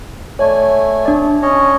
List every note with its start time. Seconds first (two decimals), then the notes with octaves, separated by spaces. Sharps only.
0.39 A3 C#5 D5 G#5
1.05 D4 D5
1.42 C#4 C#5 D#5